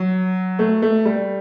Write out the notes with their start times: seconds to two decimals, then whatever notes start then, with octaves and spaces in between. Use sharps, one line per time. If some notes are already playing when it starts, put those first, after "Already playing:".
Already playing: F#3
0.59 A3
0.82 A3
1.05 G3